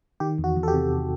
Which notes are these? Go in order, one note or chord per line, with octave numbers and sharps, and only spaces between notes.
D#3 G4
E2
F#4
E2
A4
G4
C3